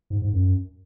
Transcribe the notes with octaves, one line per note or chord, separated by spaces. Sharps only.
G#2
G#2
F#2